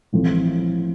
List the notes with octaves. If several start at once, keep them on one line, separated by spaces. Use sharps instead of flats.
A1 A2 F3 C4